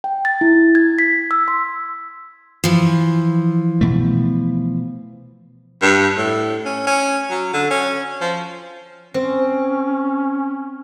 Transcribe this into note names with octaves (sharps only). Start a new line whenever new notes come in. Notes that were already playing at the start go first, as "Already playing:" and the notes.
G5
A6
E4
G#6
B6
E6
C6
E3 F3
B2 A3
G2
A2
C#4
C#4
F#3
D3
C#4
F3
C4 C#4